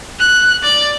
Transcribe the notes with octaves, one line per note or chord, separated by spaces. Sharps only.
F#6
D5